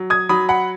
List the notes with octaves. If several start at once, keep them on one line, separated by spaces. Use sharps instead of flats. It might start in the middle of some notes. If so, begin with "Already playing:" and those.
Already playing: F#3
D#6 G#6
F#3 B5 D#6
F#5 B5